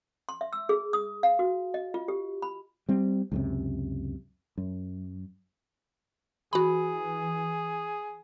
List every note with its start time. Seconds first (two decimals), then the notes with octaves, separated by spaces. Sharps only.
0.29 C6
0.41 E5
0.53 E6
0.69 G#4
0.93 D#6
1.23 F5
1.39 F#4
1.74 D#5
1.94 F4
2.08 G4
2.42 B5
2.89 G3 C4
3.32 C#2 F#2 C3
4.58 F#2
6.53 E3 F#4 G#4 B5